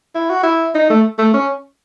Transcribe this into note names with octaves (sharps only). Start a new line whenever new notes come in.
E4
F#4
E4
D#4
A3
A3
C#4